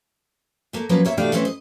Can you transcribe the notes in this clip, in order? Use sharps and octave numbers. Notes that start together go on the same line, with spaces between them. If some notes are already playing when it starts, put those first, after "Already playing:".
A3 A#3
F3 F#3 A#3 C#4 B4
A#3 C#5 E5
B2 E3 G3 A3 D4 F5
E3 A3 C4 C#4
D#5